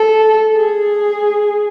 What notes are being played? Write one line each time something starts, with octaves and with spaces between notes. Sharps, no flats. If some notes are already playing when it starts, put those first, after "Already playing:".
Already playing: A4
G#4